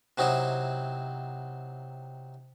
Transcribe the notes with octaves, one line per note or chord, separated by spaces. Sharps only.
C3 F#3 C4 D#4 E4